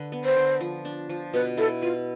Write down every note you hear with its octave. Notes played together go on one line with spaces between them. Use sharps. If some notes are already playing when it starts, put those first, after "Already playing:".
Already playing: D3 B4
B3
C5
D3
F3
D4
F3
B2 B4
E4 A4
F4 B4